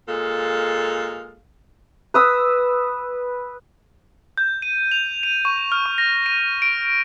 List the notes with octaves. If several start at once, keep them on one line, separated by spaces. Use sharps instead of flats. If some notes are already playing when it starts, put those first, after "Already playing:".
A#2 G#3 A4 F5
B4 D#6 E6
G6
D#7
F7
D#7
C#6
F6
C#6
A#6
D#7
D7